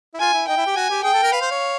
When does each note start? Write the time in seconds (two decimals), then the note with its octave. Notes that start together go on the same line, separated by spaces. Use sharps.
0.14 E4
0.20 F4 G#5
0.33 E4
0.48 D#4 G5
0.57 E4
0.66 G4
0.76 F#4 G#5
0.90 G4
1.03 G#4 G5
1.13 A4
1.22 A#4
1.32 B4 F5
1.41 C5
1.51 C#5